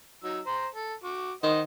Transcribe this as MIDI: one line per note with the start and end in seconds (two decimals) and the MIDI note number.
0.24 0.40 54
0.24 0.40 63
0.24 0.40 88
0.46 0.66 72
0.46 0.66 82
0.75 0.94 69
1.04 1.32 66
1.04 1.32 86
1.43 1.62 51
1.43 1.60 72
1.43 1.60 75
1.43 1.60 78